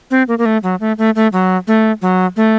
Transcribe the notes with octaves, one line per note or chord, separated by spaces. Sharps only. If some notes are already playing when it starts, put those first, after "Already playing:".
C4
A#3
A#3
A3
F#3
A3
A3
A3
F#3
A3
F#3
A3